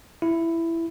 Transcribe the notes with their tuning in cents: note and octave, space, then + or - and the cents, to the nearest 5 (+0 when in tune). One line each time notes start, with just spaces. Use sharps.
E4 +10